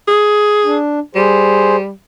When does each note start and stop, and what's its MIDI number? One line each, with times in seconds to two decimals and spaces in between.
0.08 0.76 68
0.65 0.99 62
1.15 1.91 55
1.15 1.76 68
1.15 1.76 72